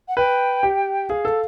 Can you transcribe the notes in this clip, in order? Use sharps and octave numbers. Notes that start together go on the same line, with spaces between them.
F#5
B4 G5
G4
G#4 F5
A4